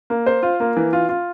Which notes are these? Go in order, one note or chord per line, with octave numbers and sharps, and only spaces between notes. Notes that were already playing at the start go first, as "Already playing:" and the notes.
A#3
C5
F4
A#3
E3
F4
F4